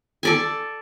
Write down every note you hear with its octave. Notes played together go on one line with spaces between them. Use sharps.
A4 D5 G#5